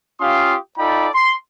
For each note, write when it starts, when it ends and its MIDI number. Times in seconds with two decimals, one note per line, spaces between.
0.21 0.56 61
0.21 0.56 65
0.21 0.56 67
0.21 0.56 77
0.21 0.56 84
0.21 0.56 87
0.78 1.09 63
0.78 1.09 65
0.78 1.09 69
0.78 1.09 74
0.78 1.09 79
0.78 1.09 83
1.15 1.35 84